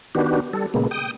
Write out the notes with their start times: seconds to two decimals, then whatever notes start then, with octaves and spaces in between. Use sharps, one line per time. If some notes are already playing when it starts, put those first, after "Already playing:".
0.15 D#3 B3 D4 F#4 G4
0.53 G3 A4
0.74 A#2 C#3 G#3 A#3 B3
0.91 G5 D#6